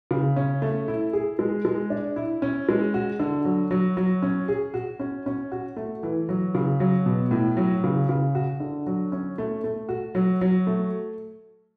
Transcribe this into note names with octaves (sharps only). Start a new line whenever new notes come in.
C#3
C#4
A3
E4
G#4
G#3
G#3
D4
E4
C#4
G#3
F#4
D3
F#3
F#3
F#3
C#4
G#4
F#4
C#4
C#4
F#4
A3
E3
F#3
C#3
F#3
B2
A2
F#3
C#3
C#3
F#4
D3
F#3
C#4
A3
A3
F#4
F#3
F#3
A3